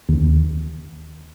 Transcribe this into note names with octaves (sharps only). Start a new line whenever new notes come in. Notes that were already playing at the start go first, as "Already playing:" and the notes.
D#2